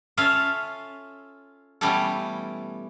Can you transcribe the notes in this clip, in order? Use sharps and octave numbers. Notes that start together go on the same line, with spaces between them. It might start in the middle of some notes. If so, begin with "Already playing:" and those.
C#4 F4 A4 E5 F5
B2 E3 G3 A3 C#4 A4